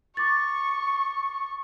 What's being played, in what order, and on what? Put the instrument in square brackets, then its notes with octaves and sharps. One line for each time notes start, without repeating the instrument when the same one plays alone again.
[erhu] C#6 [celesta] D6 A6